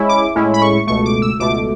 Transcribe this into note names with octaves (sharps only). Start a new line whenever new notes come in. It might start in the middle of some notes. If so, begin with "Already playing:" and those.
Already playing: G#3 C#4 E4
D6
A2 G#3 C#4 E4
B5
C#6
C#2 B2 A3 C#6
D6
E6
C#2 B2 A3 D6